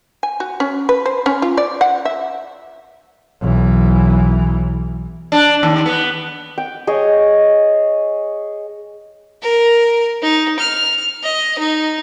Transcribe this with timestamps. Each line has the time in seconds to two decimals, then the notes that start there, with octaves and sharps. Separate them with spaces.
0.23 G#5
0.40 F#4
0.60 C#4
0.89 B4
1.06 C5
1.26 C#4
1.42 F4
1.57 D5
1.81 F#5
2.05 E5
3.41 B1 E3
5.32 D4
5.63 D#2
5.86 B3
6.58 G5
6.87 G#4 C#5 D#5
9.43 A#4
10.22 D#4
10.59 F6
11.23 D#5
11.58 D#4